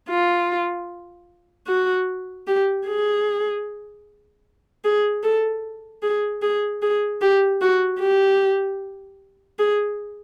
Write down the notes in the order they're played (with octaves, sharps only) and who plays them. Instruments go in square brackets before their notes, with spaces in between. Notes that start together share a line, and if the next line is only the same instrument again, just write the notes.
[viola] F4
F#4
G4
G#4
G#4
A4
G#4
G#4
G#4
G4
F#4
G4
G#4